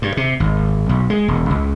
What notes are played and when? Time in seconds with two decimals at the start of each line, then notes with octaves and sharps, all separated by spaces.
0.02 G2
0.17 C3
0.40 G#1
0.89 B1
1.10 G#3
1.28 E1
1.50 C#2